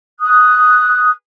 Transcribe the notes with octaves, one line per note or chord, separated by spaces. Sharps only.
D#6 F#6